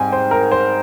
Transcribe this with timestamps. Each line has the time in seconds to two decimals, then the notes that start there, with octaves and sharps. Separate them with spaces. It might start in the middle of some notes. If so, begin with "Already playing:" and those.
Already playing: G#2 G3 C4 G5 G#5
0.12 C5
0.31 A#4
0.52 C5